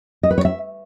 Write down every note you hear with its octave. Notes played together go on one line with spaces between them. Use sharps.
D#5
B4
C#5
E5